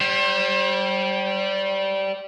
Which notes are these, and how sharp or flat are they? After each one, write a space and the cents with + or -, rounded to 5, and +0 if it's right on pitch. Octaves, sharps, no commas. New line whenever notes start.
G3 -15 C5 +35